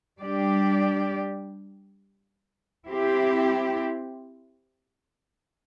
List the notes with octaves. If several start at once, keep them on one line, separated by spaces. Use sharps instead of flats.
G3 D4 G4 D5
C4 E4 G4